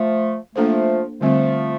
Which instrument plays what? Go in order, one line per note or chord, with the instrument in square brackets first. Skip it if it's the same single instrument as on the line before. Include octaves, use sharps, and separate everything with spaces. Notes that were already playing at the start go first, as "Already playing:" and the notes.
Already playing: [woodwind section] F3 A3
[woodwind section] F3 A3 [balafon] A#3 D4 A4 C5
[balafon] D3 G3 C4 [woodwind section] F3 A3